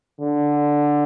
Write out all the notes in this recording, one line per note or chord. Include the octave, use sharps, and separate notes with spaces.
D3